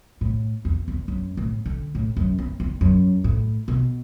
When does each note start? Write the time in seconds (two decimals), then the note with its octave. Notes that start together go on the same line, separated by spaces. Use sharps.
0.21 A2
0.65 E2
0.88 E2
1.08 F#2
1.37 A2
1.66 D3
1.95 A2
2.17 F#2
2.39 E2
2.60 E2
2.81 F#2
3.24 A2
3.68 B2